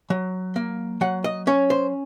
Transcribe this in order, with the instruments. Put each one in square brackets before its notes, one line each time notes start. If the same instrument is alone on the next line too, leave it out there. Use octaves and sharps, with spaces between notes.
[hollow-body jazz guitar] F#3
A#3
F#3 F#5
D#5
C#4 C#5
C5